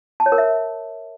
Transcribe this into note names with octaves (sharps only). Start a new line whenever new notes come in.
A5
C#5
A#4
E5